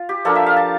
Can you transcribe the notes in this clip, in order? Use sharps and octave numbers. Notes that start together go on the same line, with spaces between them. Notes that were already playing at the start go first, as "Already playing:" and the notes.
Already playing: F4
G4
F3 A#3 D4 F4 A4
E5
F5
A5